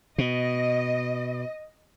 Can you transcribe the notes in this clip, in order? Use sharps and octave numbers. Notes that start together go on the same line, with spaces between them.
B2 D#5